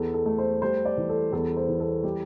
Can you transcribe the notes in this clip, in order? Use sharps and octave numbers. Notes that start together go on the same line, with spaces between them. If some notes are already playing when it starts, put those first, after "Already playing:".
Already playing: E2 A4
A4
A3
C5
G3 C5
D5
E3
A4
E2 A4
C5
E3
A4
G3 G4